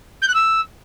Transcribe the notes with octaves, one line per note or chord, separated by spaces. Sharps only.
G6
F#6
E6